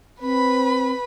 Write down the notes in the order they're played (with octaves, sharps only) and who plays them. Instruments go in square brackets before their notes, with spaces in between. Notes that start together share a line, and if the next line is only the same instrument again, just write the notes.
[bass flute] C4 [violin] B4 B5